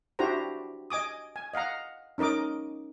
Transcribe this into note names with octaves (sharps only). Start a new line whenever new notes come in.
D4 E4 F#4 G4 C5 A#5
D#5 G#5 D6 D#6
G#5
D#5 F5 F#5 A#5
C#4 D#4 A#4 D#5 D6